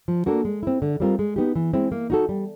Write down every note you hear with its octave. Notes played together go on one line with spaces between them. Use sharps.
F3
A#3 D4 F#4 A4
G#3
C4 E4
D3
G3 C4 F4 A#4
G#3
B3 D#4 G4
E3
G#3 C4 E4
A#3
D#4 F#4 A4
G3